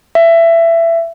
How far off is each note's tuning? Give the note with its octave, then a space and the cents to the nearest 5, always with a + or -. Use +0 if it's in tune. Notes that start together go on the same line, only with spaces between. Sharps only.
E5 +20